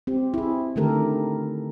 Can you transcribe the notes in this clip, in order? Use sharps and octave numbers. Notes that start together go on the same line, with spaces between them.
C4 G4
E4 G#4
D3 D#3 A3 G4 A4 A#4